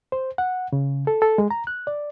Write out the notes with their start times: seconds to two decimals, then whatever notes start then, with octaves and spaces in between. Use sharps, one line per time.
0.12 C5
0.38 F#5
0.73 C#3
1.07 A4
1.22 A4
1.38 G#3
1.51 A#5
1.67 F#6
1.87 D5